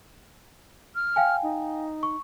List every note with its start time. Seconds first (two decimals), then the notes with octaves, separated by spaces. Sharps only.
0.95 F6
1.16 F5 G5 G#5
1.43 D#4
2.03 C#6